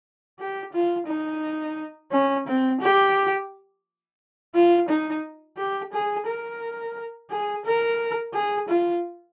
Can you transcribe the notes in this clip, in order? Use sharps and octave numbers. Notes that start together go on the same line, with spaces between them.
G4
F4
D#4
C#4
C4
G4
F4
D#4
G4
G#4
A#4
G#4
A#4
G#4
F4